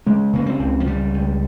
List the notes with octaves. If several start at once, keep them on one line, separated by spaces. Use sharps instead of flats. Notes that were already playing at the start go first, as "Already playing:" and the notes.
C#3 G#3
C#3 A#3
C4
C#2
F3
C#3 G3
C#2